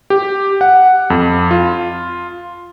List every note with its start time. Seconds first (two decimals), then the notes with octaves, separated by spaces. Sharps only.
0.10 G4
0.61 F#5
1.10 F2
1.51 F4